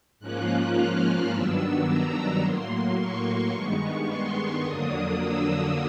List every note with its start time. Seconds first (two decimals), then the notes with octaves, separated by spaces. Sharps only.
0.20 G#2 F3 A#3 C#4 F4 F#6
0.76 F6
1.30 G2 D#3 F#3 B3 D4 E6
1.86 A#5
2.42 A2 F#3 A#3 C6
2.97 C#6
3.53 G2 D#3 G#3 B3 C#6
4.08 C6
4.64 F2 D3 F#3 A#3 D4 D#6
5.20 E6